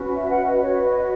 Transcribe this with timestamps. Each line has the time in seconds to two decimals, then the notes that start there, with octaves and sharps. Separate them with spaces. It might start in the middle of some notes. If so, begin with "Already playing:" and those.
Already playing: C#4 F#4 B4
0.14 E5
0.29 F#5
0.45 D#5
0.60 F#4 B4 C#5
0.83 D#5